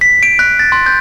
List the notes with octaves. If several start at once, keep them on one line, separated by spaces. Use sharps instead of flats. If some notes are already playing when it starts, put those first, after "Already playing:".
B6
D7
F#6
A6
C6
G6